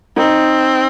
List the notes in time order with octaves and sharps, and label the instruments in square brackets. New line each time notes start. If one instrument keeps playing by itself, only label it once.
[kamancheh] C4 [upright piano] D#4